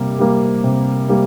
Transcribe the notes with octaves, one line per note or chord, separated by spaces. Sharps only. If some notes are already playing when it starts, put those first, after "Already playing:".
Already playing: C3 G3 A#3
G3 A#3
C3
G3 A#3